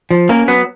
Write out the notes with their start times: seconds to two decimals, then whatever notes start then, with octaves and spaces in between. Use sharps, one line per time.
0.11 F3
0.29 A#3 C#4 A#4
0.48 F#3 B3 B4